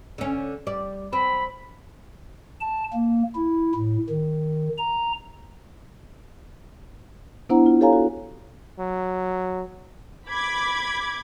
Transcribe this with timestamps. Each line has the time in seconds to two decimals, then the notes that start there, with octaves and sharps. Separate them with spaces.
0.18 D3 C#4
0.67 G3 D5
1.13 C4 B5
2.61 A5
2.93 A#3
3.35 E4
3.75 A2
4.10 D#3
4.78 A#5
7.50 B3 D4 E4 C5 F#5 A#5
7.66 F4
7.81 G4 A4 C#5 F5 G#5 A#5
7.93 F#4
8.79 F#3
10.29 B5 D6 G#6